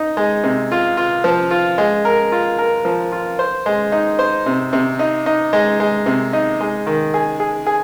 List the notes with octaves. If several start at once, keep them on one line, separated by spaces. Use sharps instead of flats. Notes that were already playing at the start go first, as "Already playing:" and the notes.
Already playing: D#4
G#3
C3
F4
F4
F3
F4
G#3
A#4
F4
A#4
F3
F4
C5
G#3
D#4
C5
C3
C3
D#4
D#4
G#3
G#3
C3
D#4
G#3
D#3
G#4
G#4
G#4